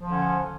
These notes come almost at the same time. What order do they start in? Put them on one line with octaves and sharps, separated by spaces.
F3 D3 C#4